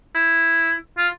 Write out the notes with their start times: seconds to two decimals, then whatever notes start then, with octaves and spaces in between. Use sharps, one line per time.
0.15 E4
0.98 F4